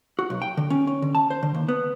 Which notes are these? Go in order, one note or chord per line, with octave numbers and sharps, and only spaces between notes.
F#4
B1
G5
D3
C#4
C#4
D3
A5
C5
D3
D#2
B3